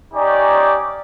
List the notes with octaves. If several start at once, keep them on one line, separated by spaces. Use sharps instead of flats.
C#4 D#4 G4 C#5 D5 G#5